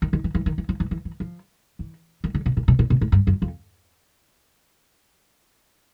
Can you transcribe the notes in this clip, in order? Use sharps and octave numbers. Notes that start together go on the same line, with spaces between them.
D#3
D#3
E3
E3
D#3
E3
F3
E3
E3
E3
F3
E3
D#3
D3
B2
A#2
B2
A#2
B2
A2
G2
F#2
F2